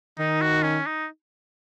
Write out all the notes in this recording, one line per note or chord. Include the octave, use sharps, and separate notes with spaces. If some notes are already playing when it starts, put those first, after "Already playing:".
D#3 D#4
F#4
C#4
D#4